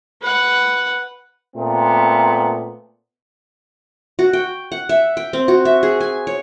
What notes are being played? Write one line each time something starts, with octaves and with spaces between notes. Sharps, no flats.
B4 F#5
A#2 A3 B3 C4
F#4
G5
F#5
E5
G5
C4
F#4
E5
G#4
G#5
C#5